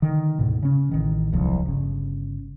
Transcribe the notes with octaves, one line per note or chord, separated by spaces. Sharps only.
D3 D#3
D2 G#2 B2
C#3 C#4
A1 D#3
D#1 C2 F3 F#3
G1 C#3